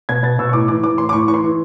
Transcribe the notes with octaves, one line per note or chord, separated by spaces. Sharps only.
B2 G#6
B2 A6
B2 E6
C#6
A2 D6
E3 D6
E3 D6
A2 C6
D6
A2 C#6
E3 C#6
C6
E3